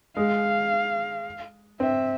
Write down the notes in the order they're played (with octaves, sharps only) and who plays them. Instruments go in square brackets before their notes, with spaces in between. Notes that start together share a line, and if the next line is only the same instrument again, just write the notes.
[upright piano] G#3 [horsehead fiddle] F5
[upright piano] C4 [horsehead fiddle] E5